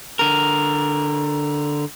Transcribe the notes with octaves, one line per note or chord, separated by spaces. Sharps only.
D3 A#4